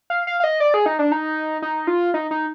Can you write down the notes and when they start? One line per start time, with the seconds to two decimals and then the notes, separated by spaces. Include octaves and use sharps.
0.10 F5
0.27 F5
0.40 F5
0.44 D#5
0.60 D5
0.74 G#4
0.86 D#4
0.99 D4
1.12 D#4
1.62 D#4
1.87 F4
2.14 D#4
2.31 D#4